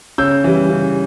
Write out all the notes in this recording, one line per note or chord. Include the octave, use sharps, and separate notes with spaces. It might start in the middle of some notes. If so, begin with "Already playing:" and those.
C#3 E6 G6
E3 G3
C#3